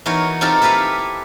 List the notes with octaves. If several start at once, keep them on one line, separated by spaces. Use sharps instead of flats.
E3 B3 D#4 F#4 A#4 C#5
C4 D#4 F4 G4 A4 A#4
E4 G4 A4 B4 F5